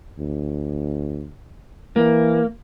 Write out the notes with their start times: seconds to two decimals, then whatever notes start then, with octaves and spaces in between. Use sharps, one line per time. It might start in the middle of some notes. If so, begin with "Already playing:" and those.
0.19 D2
1.96 E3 A#3